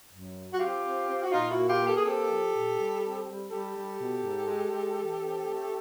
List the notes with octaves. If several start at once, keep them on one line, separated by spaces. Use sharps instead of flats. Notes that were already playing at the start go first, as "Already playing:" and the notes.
F#2
F#3
F#4
C4 F4 G4
C4
C4
F#4
A#2 D#4 F4
E4 F#4
A#3
F4 G4
A#3
G4 A4
G#4
C4 G4 A4
F3
A#2
G3
C4
G3
G3 G4 A4
G3
B2
G#2
G#3
G#3
E3
C4
A3